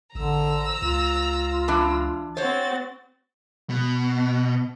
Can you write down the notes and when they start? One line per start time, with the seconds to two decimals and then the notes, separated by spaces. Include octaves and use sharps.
0.15 A1 D3 A#5 E6
0.82 C#2 F4
1.68 E3 D4
2.37 C4 F#4 C5 C#5 A6
3.70 B2